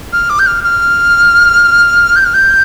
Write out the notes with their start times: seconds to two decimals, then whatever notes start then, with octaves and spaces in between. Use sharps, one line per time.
0.12 F6
0.29 D6
0.39 G6
0.46 F6
0.64 F6
2.16 G6
2.25 F6
2.34 G6